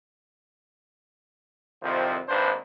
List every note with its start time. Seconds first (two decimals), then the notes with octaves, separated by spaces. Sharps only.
1.83 C2 F2 D#3 F3 C4
2.29 G#1 D#2 D4 B4 C5